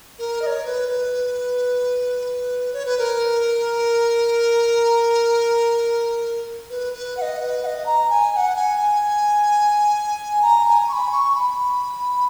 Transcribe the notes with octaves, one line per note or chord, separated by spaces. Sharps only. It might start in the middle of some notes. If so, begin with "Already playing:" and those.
A#4
D#5
C#5
B4
B4
C#5
B4
A#4
B4
B4
F#5
D#5
B4
F#5
D#5
A#5
G#5
G#5
F#5
G#5
A#5
A#5
G#5
C#6
B5
C#6
B5